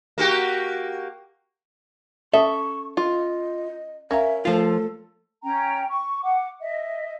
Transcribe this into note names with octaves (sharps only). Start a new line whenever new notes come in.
A#3 F#4 G4
C#4 A4 E5 C#6 D#6
F4 D#5
C#4 A#4 E5 F5 A#5
F3 A3 F4 A4
C#4 G5 A#5
C#6
F#5 D6
D#5 E5